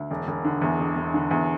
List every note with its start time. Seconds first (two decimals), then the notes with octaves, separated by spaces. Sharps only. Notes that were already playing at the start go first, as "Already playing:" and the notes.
Already playing: D2
0.11 E1
0.27 E1
0.44 D3
0.61 E2
0.80 E1
0.96 E1
1.14 D3
1.31 E2